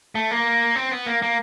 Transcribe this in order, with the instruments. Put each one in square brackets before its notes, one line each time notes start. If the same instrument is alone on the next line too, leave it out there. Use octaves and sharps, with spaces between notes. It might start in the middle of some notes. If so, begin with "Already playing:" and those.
[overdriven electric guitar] A3
A#3
C4
B3
A#3
A#3